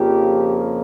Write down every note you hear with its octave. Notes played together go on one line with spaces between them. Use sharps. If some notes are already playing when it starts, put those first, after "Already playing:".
Already playing: F2 C#3 F3 A#3 G4